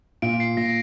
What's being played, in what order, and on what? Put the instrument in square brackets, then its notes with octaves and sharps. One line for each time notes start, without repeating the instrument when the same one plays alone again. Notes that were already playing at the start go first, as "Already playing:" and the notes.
[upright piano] A#2 [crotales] D7
[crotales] C7
[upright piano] A#2 [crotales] A#6